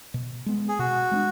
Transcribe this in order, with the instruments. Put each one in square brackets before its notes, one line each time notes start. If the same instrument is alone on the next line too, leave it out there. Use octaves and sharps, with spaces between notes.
[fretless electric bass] B2
G#3 B3
[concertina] G#4
[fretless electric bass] B2 [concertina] F#4
[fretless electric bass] G#3 B3 D4